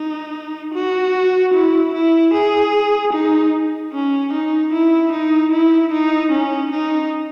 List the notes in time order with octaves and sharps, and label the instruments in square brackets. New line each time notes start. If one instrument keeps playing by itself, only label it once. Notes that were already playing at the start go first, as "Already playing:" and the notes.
Already playing: [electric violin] D#4
F#4
E4
E4
G#4
D#4
C#4
D#4
E4
D#4
E4
D#4
C#4
D#4